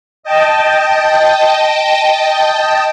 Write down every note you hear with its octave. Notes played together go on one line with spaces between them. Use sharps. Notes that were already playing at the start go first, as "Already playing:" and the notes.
D#5 G5 A5